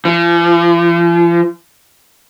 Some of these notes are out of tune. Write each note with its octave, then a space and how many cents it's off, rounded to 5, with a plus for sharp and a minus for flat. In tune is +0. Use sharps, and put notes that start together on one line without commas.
F3 -40